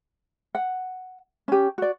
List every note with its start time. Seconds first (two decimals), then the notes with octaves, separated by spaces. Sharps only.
0.55 F#5
1.48 C#4 G4
1.78 F#4 D5